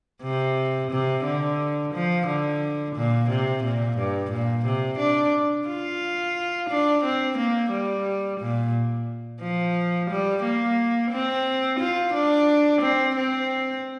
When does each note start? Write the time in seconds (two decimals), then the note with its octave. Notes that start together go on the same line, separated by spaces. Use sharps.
0.23 C3
0.91 C3
1.25 D3
1.94 F3
2.27 D3
2.96 A#2
3.29 C3
3.64 A#2
3.98 G2
4.31 A#2
4.66 C3
4.99 D4
5.68 F4
6.69 D4
7.04 C4
7.38 A#3
7.71 G3
8.40 A#2
9.41 F3
10.10 G3
10.44 A#3
11.11 C4
11.80 F4
12.14 D4
12.82 C4
13.16 C4